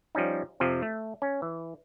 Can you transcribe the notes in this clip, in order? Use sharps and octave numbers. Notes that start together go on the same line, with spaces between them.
F3 G3 C#4 D#4
F2 C3 F3
A3
C#4
E3